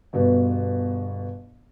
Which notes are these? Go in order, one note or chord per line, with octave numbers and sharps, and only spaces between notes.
G1 B2